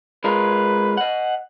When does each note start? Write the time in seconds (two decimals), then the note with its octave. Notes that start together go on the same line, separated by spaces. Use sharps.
0.24 G#3 F4 A#4 B4
0.97 D#5 F#5